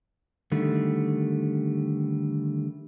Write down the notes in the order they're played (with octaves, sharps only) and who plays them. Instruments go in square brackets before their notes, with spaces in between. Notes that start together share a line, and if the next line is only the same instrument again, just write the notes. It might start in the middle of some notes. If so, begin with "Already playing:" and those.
[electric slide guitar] D3 D#3 G3 A3